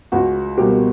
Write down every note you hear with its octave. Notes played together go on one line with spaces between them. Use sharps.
C#2 F#4
B2 G3 A#3 G4